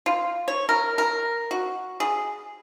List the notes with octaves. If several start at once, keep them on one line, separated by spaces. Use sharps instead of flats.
F4
C#5
A#4
A#4
F#4
G#4